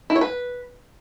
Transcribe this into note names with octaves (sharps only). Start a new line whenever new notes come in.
E4
C#5
B4